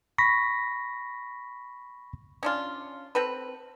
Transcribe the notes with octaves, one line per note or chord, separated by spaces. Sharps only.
B5 C#6 A#6 B6
C#4 D4 F4
C4 A4 B4